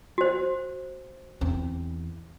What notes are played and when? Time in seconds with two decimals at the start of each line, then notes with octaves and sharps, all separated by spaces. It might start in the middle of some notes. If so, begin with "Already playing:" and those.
0.18 F#4 C5
1.41 E2 C4